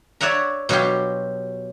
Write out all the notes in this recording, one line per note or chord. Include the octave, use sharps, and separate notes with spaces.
C#5 D5 E5 F#5 A#5
B2 F#3 F4 G4